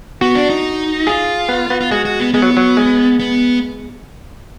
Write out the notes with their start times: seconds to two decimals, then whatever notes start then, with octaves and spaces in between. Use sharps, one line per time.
0.21 B3 F#4
0.35 D4
0.50 D#4
1.07 F4 G#4
1.49 B3
1.70 B3
1.81 F4
1.91 G#3 F#4
2.05 F#4
2.20 B3
2.34 G#3 B3
2.42 F#3
2.57 F#3
2.77 G#3
3.19 B3